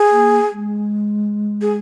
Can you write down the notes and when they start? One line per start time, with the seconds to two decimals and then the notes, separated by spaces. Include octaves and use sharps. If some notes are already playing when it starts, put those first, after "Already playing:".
Already playing: G#4
0.11 A#3
0.52 G#3
1.61 G#4